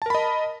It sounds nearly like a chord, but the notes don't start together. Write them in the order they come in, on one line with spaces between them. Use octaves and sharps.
A5 A#4 B5 D#5